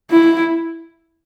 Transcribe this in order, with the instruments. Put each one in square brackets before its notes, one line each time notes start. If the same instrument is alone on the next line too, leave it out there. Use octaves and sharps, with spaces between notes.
[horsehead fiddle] E4